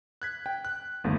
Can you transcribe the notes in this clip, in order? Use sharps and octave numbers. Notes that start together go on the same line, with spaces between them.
F#6 G#6 B6
G5
F#6
G1 D#2 A3